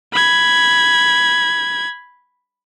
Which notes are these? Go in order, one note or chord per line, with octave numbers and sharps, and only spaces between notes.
B5 G#6